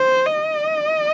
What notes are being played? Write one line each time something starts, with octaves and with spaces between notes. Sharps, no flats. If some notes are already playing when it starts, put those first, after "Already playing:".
Already playing: C5
D#5